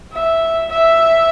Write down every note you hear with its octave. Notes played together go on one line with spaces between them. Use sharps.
E5
E5